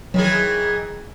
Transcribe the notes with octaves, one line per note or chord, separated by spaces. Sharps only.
D#3 E3 F#3 G#4